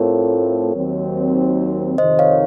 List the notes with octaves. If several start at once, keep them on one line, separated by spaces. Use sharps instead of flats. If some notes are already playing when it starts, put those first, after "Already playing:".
Already playing: A2 A3 C4 F4 A4 A#4 C#5
D#2 D#3 F#3 C4
F2 C3 D#3 C5 D#5
C#5 F5